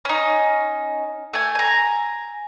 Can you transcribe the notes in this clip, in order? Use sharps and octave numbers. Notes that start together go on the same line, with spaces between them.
C#4 D#4
A3 G#5
G#5 A#5